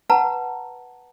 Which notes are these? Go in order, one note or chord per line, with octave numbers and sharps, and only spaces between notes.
B4 F#5 A5 A#5